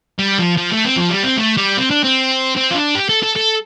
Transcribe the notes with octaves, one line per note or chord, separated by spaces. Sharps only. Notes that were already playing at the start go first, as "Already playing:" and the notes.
G3
F3
F3
A3
C4
F3
G3
C4
A3
G3
C4
D4
C4
C4
F4
D4
G4
A4
A4
A4